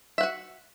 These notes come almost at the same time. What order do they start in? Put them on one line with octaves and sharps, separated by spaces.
E5 F#5 F#4